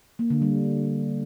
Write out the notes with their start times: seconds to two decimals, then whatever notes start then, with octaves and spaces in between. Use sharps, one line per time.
0.19 A#3
0.30 D3
0.42 G3